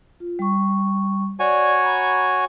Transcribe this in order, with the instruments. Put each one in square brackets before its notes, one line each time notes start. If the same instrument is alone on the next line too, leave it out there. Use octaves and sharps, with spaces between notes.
[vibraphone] F4
G3 C#6
[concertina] F#4 C#5 G#5 [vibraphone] D5
[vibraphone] A#5 B5